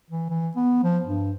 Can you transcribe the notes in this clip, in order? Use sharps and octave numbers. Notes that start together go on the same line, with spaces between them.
E3
E3
B3
F3
G2